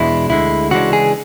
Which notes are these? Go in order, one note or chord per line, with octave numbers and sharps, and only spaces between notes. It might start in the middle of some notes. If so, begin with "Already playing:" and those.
Already playing: E2 B2 G#3 D4 E4
D2 D3 G#3 E4
C#3 E3 G#3 D4 F#4
G#4